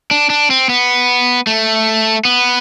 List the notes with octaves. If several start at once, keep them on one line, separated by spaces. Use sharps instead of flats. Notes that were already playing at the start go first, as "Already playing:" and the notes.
D4
D4
C4
B3
A3
B3